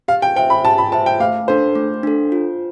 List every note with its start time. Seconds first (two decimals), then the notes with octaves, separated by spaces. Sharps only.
0.08 G4 F5
0.22 G5
0.36 C5 E5 G5
0.50 B5
0.65 G4 A5
0.78 B5
0.92 C5 E5 A5
1.06 G5
1.20 A3 F5
1.48 D4 A4 C5
1.75 A3
2.03 D4 A4
2.32 F4